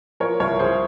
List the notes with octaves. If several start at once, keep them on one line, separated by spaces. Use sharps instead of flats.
F3 A#4 C#5
C2 A#4 C#5
C2 G#4 C5